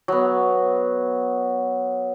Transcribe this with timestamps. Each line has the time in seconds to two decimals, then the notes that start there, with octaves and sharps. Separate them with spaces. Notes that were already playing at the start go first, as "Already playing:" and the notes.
0.08 F#3 B3